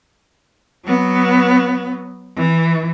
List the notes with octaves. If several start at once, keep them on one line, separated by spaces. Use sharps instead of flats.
F#3 B3
E3